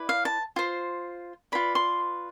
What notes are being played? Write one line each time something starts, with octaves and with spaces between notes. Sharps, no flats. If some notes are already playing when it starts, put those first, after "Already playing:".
Already playing: E4 B4 D5
F5
A5
F4 C5
F4 B4 D5 B5
C6